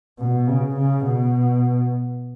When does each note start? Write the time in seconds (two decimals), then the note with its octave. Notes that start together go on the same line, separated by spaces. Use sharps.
0.19 B2
0.47 C#3
0.76 C#3
1.05 B2